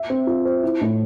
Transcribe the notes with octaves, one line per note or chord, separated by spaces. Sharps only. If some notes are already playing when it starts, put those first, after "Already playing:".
Already playing: E5
C4
F4
C5
E4
A2